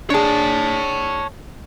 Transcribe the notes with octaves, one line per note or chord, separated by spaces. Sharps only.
D4 G#4 C#5 A5